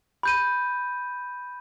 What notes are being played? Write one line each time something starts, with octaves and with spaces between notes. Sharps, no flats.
B5 G6 D#7